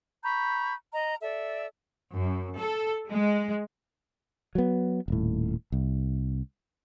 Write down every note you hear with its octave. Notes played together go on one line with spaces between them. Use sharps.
A#5 B5 C#6 G6
D#5 A#5
A4 D5 E5
F#2
A4
G#3
F#3 B3
D#1 A2
C2